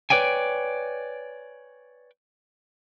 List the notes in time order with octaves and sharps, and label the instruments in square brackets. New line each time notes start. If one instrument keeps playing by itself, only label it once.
[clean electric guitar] B4 C#5 D5 G5 G#5